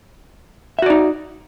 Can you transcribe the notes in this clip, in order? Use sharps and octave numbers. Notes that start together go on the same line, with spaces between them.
D#4 F#4 D5 E5